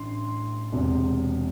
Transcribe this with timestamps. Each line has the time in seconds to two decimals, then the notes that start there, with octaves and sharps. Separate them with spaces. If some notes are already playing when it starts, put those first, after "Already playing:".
Already playing: A1 G2 C6
0.72 E1 E2 C3